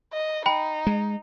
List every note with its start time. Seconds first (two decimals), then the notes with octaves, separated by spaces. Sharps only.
0.13 D#5
0.46 D#4 G5 B5
0.87 G#3